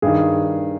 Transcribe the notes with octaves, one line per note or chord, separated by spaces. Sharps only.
G2 D#3 G#4